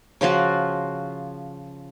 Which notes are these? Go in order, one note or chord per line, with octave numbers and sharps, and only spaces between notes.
C#3 F3 F4 F#4